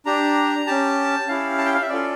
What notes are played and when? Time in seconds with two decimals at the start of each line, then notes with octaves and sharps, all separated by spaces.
0.06 D4 G4 A#5
0.67 C#4 G4 A5
1.28 C#4 E4 G4 F5
1.58 A5
1.66 G5
1.74 F5
1.82 E5
1.89 C#4 F4 A4 D5